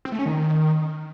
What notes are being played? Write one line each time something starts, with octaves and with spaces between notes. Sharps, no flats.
C4
A3
C#4
D#3